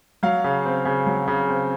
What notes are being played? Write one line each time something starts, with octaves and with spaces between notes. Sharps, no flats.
F#3 F5
C#3
C4
C#3
F#3
C#3
C4